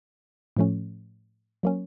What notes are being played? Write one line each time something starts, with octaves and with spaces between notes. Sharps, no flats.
A2 F3 A3 C#4
F#3 A#3 C#4